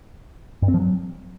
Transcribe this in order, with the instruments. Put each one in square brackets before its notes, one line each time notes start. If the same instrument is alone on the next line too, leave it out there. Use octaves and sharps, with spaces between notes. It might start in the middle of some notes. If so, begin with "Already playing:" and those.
[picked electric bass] G2
C4
F3
F#3